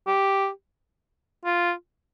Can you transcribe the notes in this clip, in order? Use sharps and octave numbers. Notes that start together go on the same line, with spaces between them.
G4
F4